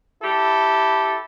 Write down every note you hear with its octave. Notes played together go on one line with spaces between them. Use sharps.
E4 G4 A4